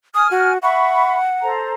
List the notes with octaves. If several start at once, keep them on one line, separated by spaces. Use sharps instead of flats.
G#5 D#6 F6
F#4
E5 F#5 B5 C#6
A4 C5 A#5